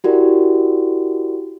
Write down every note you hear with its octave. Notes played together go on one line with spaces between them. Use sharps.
E4 F#4 G4 A#4 D5